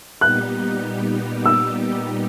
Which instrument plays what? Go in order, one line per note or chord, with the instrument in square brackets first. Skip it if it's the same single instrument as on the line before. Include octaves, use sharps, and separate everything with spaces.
[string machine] A#2 G3 B3 D#4 G4 [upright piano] F#6
[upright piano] E6